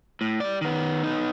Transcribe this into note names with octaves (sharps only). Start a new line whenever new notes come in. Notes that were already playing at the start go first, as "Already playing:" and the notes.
A2
G3 D5
D#3 B3
B3 D#4